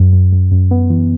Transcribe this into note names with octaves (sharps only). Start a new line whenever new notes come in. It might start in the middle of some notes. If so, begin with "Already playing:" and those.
Already playing: F#2
F#2
F#2
F#2
B3
E3